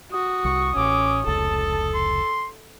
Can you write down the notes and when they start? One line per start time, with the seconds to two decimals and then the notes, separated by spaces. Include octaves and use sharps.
0.12 F#4 D#6
0.45 C2 C#6
0.76 A1 C#4 D6
1.27 F1 C#2 C#3 A4 A5
1.94 C6